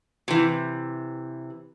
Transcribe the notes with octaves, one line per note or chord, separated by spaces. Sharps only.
C3 E3